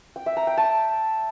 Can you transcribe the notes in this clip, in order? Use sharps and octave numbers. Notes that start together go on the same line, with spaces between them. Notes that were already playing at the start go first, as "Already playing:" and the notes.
G5
E5
A#5
G5
A5